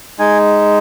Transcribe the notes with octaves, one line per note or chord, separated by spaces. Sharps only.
G#3 D#4 G#5